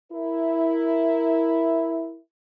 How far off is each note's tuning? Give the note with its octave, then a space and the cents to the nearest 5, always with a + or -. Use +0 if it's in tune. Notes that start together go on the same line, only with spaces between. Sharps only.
E4 +0 A#4 +0